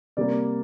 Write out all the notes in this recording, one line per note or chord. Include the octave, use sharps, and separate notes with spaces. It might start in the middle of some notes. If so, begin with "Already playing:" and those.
C3 G3 A#3 D5